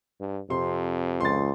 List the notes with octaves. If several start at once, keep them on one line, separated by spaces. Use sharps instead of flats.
G2
F2 C3 C6
C#2 C6 A6